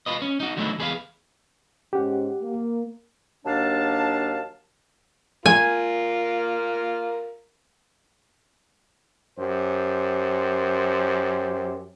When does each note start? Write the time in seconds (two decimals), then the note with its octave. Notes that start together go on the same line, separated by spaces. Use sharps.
0.06 F4 B4 D#5
0.22 C#4
0.40 D#4 F#4
0.57 D3 D#3 F#3 A3 D#4 E4
0.79 E2 G#4 B4 D5 F5
1.93 G#2 C#4 G4 F#5
2.40 A#3
3.45 D#2 F#3 A#3 D4 F5 A5
5.46 F4 A#4 G#5
9.38 F#2 G4 C5